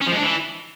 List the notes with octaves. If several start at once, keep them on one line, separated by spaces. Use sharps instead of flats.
C#4
F3
G#2
D4
E3